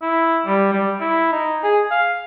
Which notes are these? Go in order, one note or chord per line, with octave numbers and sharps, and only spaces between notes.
E4
G3
G3
E4
D#4
G#4
F5